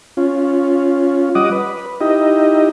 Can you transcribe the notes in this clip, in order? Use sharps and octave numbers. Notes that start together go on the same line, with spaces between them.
C#4 F4
G3 D#5 F#5 D6 D#6
B4
D#4 E4 G4 D#5